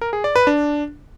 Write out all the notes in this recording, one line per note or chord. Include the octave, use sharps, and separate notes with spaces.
A#4
G#4
D5
B4
D4